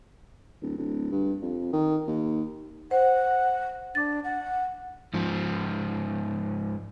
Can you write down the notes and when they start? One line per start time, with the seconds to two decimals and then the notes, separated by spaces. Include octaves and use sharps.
0.62 D1
0.77 D1
1.12 G2
1.42 F2
1.73 D#3
2.07 D#2
2.91 C5 F#5
3.95 D4 D6 A6
4.24 F#5
5.14 G#2 F3